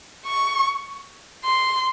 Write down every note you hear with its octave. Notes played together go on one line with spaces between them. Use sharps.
C#6
C6